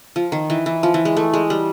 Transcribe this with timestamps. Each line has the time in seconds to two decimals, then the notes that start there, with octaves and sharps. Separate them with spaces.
0.16 F3
0.32 D#3
0.50 E3
0.66 E3
0.83 F3
0.94 E3
1.05 G#3
1.17 A3
1.34 G#3
1.50 G3